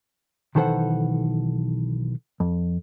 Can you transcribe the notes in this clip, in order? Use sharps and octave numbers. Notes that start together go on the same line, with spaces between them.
B1 D#3 E3 A4 C5 F#5
F2